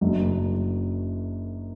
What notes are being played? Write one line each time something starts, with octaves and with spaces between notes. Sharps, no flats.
F#1 F#2 F#3 D4